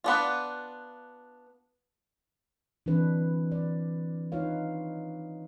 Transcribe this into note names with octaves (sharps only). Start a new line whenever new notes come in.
B3 D4 F4
E3 G3 C4 D4 E4 B4
D5
D#4 F4 B4 C#5 F5